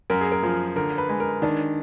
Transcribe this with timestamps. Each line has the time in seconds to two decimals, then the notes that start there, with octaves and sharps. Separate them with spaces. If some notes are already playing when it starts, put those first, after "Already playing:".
0.10 F#2 A#4
0.21 G#4
0.32 A#4
0.43 F3
0.76 D3 A#4
0.98 B4
1.09 G#3
1.20 A#4
1.42 D#3 D4